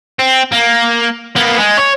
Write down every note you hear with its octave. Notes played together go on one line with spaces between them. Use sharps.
C4
A#3
A#3 B3
G#3
C#5